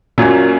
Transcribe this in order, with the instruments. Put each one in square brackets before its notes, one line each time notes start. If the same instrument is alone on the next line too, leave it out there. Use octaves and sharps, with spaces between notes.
[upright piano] F#2 F#3 C#4 [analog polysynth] A#2